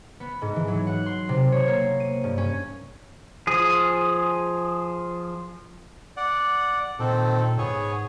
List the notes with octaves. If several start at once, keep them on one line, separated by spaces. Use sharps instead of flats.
B3
G#2
E3
F#3
F#5
C6
C3
C#5
A#3
D#7
G2
C#4
F3 G#4
D5 F#5
A#2 D#3 C4 A4
G#2 B3 G#4 C#5